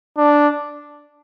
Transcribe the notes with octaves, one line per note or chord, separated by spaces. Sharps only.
D4